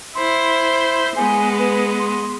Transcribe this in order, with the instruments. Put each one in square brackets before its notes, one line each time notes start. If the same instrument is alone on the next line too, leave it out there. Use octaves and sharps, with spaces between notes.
[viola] E4 C5 [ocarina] C6
[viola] G#3 B3 [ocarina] G#5
[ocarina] B4
C6